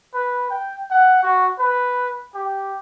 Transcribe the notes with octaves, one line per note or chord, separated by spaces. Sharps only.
B4
G5
F#5
F#4
B4
G4